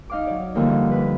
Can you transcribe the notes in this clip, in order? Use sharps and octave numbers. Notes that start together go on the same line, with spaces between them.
D#4 F5 D6
F#3 D5
D3 F3 G3 A#3 D4 D#4
B4